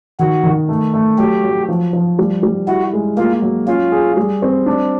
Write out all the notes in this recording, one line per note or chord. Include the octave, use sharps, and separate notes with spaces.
D#3 F#4
D#3
A3
A3
F#3 G4
F#3
F3
F3
G3
G3
E4 F#4
G#3
A#3 F4
F#3
C#4 F4
G#4
G3
C4
D4